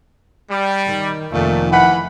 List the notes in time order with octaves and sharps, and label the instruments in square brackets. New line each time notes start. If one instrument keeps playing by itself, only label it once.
[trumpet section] G3
[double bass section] D#3
[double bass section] F1 D#3 [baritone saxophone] A#2 [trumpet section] A3
[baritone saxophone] E3 [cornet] F#5 [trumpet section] B5